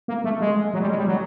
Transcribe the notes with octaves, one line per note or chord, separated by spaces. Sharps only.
A#3
A3
G#3
F#3
G3
G#3
G3
F#3